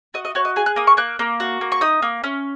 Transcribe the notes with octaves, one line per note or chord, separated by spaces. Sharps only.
F#4 D#5
D#5
F#4 C#5
D#5
G#4 G#5
F#6
A#3 D#6
C#6
A#3 F#6
A#3
F#4
A#3
C#6
D#4 D#6
A#3
C#4